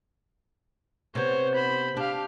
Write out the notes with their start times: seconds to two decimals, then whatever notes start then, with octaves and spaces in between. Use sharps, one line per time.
1.15 C3 B3 C5 C#5
1.54 C5 B5
1.97 D4 G4 F5